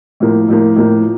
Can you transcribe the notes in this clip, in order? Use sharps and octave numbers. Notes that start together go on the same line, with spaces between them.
A2 F3 A#3
A2 F3 A#3
A2 F3 A#3